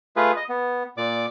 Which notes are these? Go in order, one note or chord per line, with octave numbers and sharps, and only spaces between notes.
A3 F4 G#4 B4
D#5
B3
A#2 D5 D6